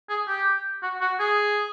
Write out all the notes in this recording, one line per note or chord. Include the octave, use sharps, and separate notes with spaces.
G#4
G4
F#4
F#4
G#4